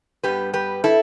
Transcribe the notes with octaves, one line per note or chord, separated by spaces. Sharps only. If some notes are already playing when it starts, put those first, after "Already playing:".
G2 G3 B3 G4 B4
G4 B4
E4 A4